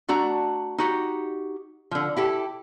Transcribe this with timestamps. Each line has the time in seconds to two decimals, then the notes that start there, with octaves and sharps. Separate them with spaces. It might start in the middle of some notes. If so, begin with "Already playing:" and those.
0.08 A3 D4 F#4 A#5
0.78 D#4 F#4 G4
1.91 D3 F3
2.16 E4 G4 A4